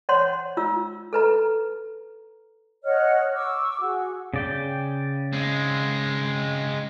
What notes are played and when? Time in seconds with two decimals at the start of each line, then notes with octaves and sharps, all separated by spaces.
0.09 C5 C#5 F#5 C6
0.57 F4 E6
1.13 A4 B4 A#5
2.83 C#5 D#5 F#5 F6
3.33 C#6 D6 E6
3.81 F#4 G#4
4.34 C#3 D5 G5
5.33 G#3 C4